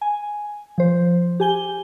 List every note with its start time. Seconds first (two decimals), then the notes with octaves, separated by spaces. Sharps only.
0.01 G#5
0.78 F3 C5
1.40 G4 G#5 G7